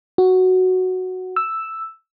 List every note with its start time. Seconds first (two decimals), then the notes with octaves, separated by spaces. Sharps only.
0.18 F#4
1.36 E6